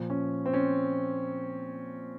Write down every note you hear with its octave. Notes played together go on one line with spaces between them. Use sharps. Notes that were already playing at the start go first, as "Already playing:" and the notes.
Already playing: A#2 F3
C#4
C4
C#4